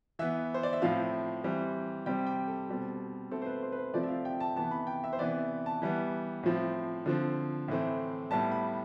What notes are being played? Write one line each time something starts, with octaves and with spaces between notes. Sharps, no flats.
E3 B3 E5
C5
D5
E5
A2 F3 C4 F5
E3 G3 C4
C3 G3 C4 G5
G5
A4
B2 G3 C4
B2 A3 C4 A4
C5
B4
C5
B4
C5
C3 F3 A3 C4 D5
E5
F5
G5
A5
C3 E3 B3 A5
B5
G5
E5
C5
C3 E3 B3 D5
A5
E3 G3 B3
A2 F3 C4
D3 F3 C4
A2 E3 A3 C4
A2 G3 B3 A5
B5